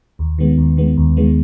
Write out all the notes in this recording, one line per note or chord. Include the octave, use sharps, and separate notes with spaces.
D#2
D#3 G#3 B3
D#2
D#3 G#3 B3
D#2
D#3 G#3 B3